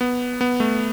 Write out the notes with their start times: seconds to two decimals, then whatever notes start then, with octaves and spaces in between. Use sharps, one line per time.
0.01 B3
0.41 B3
0.60 A3